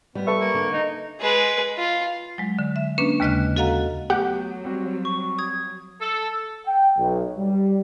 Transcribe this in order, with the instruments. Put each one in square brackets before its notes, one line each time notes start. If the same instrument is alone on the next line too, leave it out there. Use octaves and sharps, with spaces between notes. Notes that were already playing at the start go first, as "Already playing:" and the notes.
[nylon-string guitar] G3 [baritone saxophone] B3
[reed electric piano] A4 B4 E5 [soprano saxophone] C#6
[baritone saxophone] A#3
[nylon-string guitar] D3
[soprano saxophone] D#4
[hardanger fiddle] G#3 B4
F4
[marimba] F#3 G#3
D3
E5
A#3 C#4 D4 B4
D#2 C#3 G#3 D#5 F6 F#6
F#4 A4 D#5 F5 F#5 A#5
[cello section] F#3 [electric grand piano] A3 B3 [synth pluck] G4 F#5 [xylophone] G6
[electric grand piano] G3 C4 F#4
[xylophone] C#6
D#6 G#6
[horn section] A4
[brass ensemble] G5
B1
G3